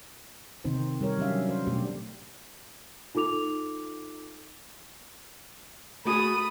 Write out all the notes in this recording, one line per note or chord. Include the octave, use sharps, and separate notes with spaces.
C3 D#3 C4 D#4 C5
G3 G4 A#4 C#5
F#3 G3 C#4 D4 E5 F5
C5
B2 A3 D4 G4
D#4 F4 A4 D6 F7
A3 F#4 G#4 B5 D#6